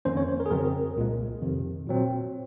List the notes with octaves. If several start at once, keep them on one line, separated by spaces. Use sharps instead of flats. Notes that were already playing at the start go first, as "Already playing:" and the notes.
F2 D#3 A#3 C#4 C5
C#5
C5
A#4
G#4
F2 C#3 F#3 C4 A#4
C2 A#2 G#3
F2 C3 D#3
A#2 F#3 C4